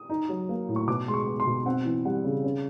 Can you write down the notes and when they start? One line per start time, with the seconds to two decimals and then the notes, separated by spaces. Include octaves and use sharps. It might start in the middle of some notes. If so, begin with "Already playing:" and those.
Already playing: D#6
0.10 D#4
0.29 F#3
0.49 A#3
0.69 A2
0.76 C#6
0.87 B2 D6
1.08 G#3 C6
1.14 C#6
1.27 B3
1.40 C6
1.46 B2
1.66 C4 F#5
1.85 E3
2.05 G3 F#5
2.25 C#3
2.44 C#4